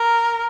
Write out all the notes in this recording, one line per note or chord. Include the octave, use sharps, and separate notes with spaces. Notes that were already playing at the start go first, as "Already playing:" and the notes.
Already playing: A#4